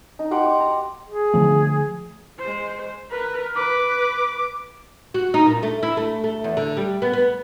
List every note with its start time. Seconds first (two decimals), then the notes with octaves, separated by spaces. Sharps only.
0.19 D#4
0.31 G4 F#5 C6 D6
0.45 D6
0.60 A#5
1.09 G#4
1.34 D3 F3 A3
2.39 G#3 C5
3.11 A#4 B4
3.56 B4 D6
5.14 F#4
5.34 D#4
5.46 A#2
5.63 A3
5.83 E4
5.97 A3
6.24 A3
6.44 E2
6.57 D3
6.77 G3
7.02 B3
7.13 B3